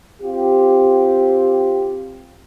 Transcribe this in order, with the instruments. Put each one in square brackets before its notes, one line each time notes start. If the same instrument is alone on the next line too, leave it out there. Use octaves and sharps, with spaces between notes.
[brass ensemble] C4 F4 G4